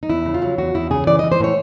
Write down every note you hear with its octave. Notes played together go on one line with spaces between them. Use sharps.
D#4
E2 E4
C#3
F4
F#3
E2 F#4
E2 E4
C#3 G#4
E3 D5
E3 D#5
C5
A2 C#5